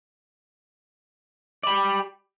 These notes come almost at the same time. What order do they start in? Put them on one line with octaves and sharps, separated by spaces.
D5 B5 G4